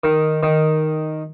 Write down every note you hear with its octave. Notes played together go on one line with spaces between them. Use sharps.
D#3
D#3